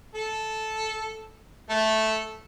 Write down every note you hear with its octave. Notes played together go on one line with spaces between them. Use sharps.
A4
A3 A4